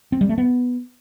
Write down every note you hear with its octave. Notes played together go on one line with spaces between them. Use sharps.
C4
G3
A3
B3